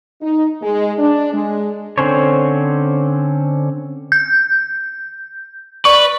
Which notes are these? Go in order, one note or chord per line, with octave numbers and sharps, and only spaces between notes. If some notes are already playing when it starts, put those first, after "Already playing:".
D#4
G#3
D4
G#3
D3 C4 C#4 C5 C#5
G6
B4 D5 C#6